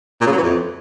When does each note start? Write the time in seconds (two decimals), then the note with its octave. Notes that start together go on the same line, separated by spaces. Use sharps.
0.21 A#2
0.27 C#3
0.32 F#3
0.37 E3
0.43 F2